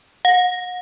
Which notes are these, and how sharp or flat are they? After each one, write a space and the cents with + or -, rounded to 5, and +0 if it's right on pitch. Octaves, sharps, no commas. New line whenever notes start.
F#5 -40